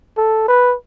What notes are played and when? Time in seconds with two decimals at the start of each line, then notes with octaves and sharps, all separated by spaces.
0.17 A4
0.48 B4